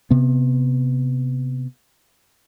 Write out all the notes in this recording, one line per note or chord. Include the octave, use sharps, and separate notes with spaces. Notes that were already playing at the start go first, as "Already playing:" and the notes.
C3 B3